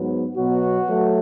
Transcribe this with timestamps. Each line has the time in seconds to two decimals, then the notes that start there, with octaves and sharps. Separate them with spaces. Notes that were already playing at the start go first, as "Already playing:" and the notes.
Already playing: G#2 F#3 B3
0.36 B2 F#3 B3 F#4
0.88 F#3 A3